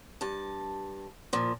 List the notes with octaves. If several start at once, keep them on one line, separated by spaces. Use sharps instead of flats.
G2 A5
A#2 F3